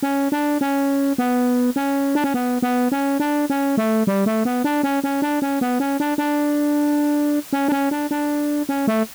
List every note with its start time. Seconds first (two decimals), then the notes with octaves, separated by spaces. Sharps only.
0.03 C#4
0.32 D4
0.61 C#4
1.18 B3
1.76 C#4
2.15 D4
2.24 C#4
2.34 B3
2.62 B3
2.92 C#4
3.20 D4
3.50 C#4
3.77 A3
4.07 G3
4.26 A3
4.45 B3
4.64 D4
4.83 C#4
5.04 C#4
5.22 D4
5.42 C#4
5.61 B3
5.80 C#4
6.00 D4
6.18 D4
7.53 C#4
7.68 D4
7.72 C#4
7.91 D4
8.11 D4
8.69 C#4
8.87 A3